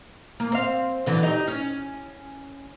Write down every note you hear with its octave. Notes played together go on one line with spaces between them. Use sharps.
A#3
C4 F5
D3 E3 F#3
D#4 G4
C#4